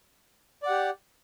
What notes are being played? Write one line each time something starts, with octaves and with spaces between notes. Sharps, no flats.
G4 D5 F#5